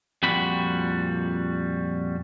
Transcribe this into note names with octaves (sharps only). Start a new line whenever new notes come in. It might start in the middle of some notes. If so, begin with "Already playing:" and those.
F2 A#2 G3 F#4 B5